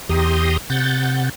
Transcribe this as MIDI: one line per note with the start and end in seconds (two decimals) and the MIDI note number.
0.09 0.57 40
0.09 0.57 67
0.09 0.57 82
0.09 0.57 84
0.09 0.57 87
0.70 1.29 48
0.70 1.29 78
0.70 1.29 91
0.70 1.29 93